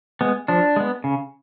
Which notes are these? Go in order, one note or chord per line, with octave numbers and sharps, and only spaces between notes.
G#3 B3
F3 D4
G#3 B3
C#3